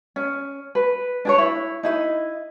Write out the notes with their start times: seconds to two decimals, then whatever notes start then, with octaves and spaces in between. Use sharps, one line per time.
0.16 C#4
0.75 B4
1.25 D4 G#4 C#5
1.38 E4
1.83 D#4 E4 D#5